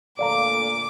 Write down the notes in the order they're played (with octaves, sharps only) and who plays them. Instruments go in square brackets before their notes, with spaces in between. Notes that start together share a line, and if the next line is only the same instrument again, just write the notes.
[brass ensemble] D2 A#2 A4 [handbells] D5 F5 A#5 [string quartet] D6